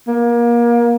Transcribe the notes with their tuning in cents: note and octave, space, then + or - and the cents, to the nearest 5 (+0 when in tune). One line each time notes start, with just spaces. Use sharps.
A#3 +25